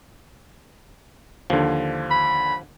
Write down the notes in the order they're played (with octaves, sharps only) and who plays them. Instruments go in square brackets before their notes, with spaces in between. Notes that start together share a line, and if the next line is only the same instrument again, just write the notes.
[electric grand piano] D#2 D3 [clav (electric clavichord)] F3
[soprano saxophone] B5